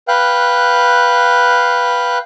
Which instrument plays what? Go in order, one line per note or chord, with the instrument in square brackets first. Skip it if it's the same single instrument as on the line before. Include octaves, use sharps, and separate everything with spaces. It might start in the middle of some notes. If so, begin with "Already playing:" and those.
[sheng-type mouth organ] B4 F5 G5 F#6